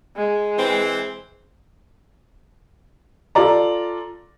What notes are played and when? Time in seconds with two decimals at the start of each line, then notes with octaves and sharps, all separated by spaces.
0.16 G#3
0.58 E3 C4
3.35 F4 A4 D5 A#5